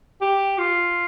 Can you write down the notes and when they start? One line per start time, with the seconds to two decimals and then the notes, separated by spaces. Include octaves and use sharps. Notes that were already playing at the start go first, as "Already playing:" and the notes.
0.21 G4
0.58 F4